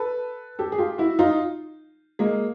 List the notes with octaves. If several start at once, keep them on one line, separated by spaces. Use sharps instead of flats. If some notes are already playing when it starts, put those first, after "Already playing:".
Already playing: A4 B4
G4 A4
G#4
F4 G4
E4 F#4
D#4 F4
G#3 A#3